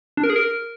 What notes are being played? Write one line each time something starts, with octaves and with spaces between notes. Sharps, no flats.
D4
A#4
G#4
A#4